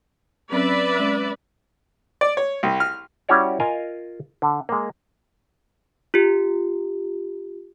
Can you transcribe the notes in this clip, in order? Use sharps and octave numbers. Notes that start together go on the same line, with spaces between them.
F#3 C4 C#4 B4 D5 E5
G#3 C#4
D5
C#5
C2
F6
G3 C#4 E4 F#4 C#5 D5
F4 A#4 D#5 F5 G#5
D3
G#3 A#3
F4 G4